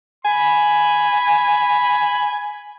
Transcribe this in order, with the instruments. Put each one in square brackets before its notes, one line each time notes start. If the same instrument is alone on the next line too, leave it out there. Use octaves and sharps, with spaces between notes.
[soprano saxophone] G#5 [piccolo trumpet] B5